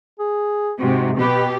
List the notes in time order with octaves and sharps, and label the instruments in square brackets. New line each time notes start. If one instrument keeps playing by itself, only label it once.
[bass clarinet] G#4
[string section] G#2 C3 [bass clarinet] F#4
[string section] B2 G4 [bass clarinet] B4